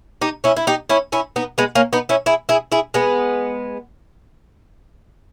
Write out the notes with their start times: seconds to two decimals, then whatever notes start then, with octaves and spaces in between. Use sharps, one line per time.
0.22 D#4 G4
0.44 C#4 E4
0.56 E4
0.67 D#4 G4
0.89 C#4 E4
1.12 C#4 E4
1.36 B3 D#4
1.58 G#3 B3
1.75 A#3 C#4
1.93 B3 D#4
2.09 C#4 E4
2.26 E4 G#4
2.49 E4 G#4
2.72 E4 G#4
2.94 G#3 B3